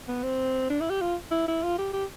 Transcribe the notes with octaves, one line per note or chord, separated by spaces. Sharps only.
B3
C4
D4
E4
G4
F4
E4
E4
F4
G4
G4